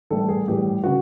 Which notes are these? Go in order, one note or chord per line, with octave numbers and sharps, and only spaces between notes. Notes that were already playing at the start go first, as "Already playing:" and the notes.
A2 E3 G3 A4
G#4
A2 E3 G3 G4
C#3 F#4